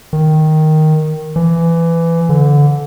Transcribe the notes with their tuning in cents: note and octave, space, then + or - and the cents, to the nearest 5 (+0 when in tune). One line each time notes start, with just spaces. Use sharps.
D#3 +0
E3 +20
D3 -20